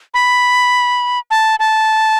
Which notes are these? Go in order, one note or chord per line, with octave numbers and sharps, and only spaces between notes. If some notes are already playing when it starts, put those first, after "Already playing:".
B5
A5
A5